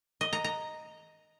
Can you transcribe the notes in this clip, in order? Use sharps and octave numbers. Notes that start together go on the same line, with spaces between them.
D#5
A#5
A#5